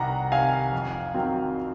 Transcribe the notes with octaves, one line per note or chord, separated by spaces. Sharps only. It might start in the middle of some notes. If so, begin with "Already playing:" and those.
Already playing: C2 C3 D#3 F#5 A#5
C3 D#3 F5 G#5
F2
D#3 F#3 C4